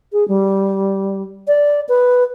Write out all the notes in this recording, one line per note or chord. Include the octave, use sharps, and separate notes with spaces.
G#4
G3
D5
B4